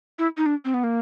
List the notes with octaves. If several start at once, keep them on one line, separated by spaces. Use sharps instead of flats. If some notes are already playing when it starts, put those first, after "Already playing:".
E4
D#4
D4
C4
B3
A#3